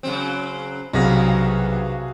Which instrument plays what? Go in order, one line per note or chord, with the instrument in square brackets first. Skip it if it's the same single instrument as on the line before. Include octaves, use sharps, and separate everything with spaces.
[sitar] C#3 F#3 C4
[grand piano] B1 A#6 [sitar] G2 B3 [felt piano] C3 [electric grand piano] F#4 G#4 F5